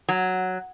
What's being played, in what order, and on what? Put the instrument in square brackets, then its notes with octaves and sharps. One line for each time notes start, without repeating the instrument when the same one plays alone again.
[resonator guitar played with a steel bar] F#3